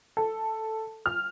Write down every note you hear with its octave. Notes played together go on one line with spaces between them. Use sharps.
A4
F6